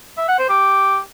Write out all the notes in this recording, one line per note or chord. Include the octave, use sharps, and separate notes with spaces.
E5
F#5
C5
G4